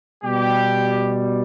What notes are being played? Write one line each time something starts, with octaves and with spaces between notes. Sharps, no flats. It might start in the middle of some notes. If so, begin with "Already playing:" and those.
B2 G3 G4